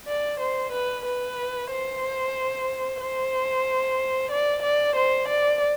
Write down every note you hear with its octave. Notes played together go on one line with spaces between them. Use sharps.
D5
C5
B4
B4
C5
C5
D5
D5
C5
D5